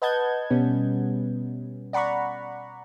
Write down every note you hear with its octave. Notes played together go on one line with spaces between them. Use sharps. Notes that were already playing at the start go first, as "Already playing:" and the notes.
B4 D#5 F#5 A5 G6 G#6
B2 G3 B3 C#4
D5 F#5 A#5 B5 C#6